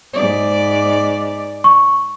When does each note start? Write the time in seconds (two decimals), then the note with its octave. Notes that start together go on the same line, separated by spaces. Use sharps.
0.13 G#2 D5
1.64 C#6